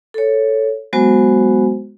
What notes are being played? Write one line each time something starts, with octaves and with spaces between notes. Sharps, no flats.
A4 C#5
F#3 G#3 B3 F#4 C5 G#5